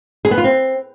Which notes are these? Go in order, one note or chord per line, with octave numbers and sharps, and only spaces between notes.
G#4
B3
F4
C4